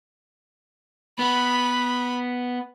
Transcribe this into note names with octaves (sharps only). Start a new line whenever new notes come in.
B3 B5